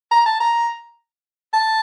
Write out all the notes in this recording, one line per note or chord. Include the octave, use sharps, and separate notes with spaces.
A#5
A5
A#5
A5